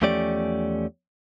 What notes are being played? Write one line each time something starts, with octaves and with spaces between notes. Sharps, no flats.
E2 F3 A3 C#4 G4 D5